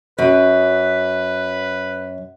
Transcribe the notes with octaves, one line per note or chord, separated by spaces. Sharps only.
F#2 B4